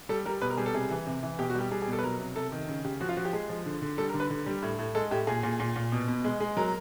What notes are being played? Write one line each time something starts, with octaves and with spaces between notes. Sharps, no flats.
G3 A4
G3 A#4
B2 B4
A#4
G3 G#4
A4
C3 G#4
E3
C3
E3
B2 G4
F#4
G3
G4
G3 G#4
G#4
B2
A4
B4
F#3 A#4
C3
C3 A4
D#3
C#3
C#3 G4
F3 F#4
F4
F3 F#4
G4
G#3 G#4
F3
D3
D3
G3 A4
A#4
D3
B4
D3
G3
A2
A2
G#3 A4
A2 G4
A#2 G#4
A#2
A#2
A#2
B2
B2
G#3
G#3
F#3 A#4